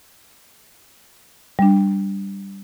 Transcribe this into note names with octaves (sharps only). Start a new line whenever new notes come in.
G3 D4